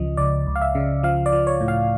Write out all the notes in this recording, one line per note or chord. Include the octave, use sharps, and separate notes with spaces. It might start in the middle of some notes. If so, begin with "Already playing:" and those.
Already playing: C#2 C#3 F3 D#5
C#2 D5
C#2
F5
E5
C#3
F3 F5
D5
F3
C#5
A2
F5